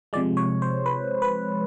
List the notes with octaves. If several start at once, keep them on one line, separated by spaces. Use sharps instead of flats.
C3 F3 G#3 D5
C#5
C5
B4
B4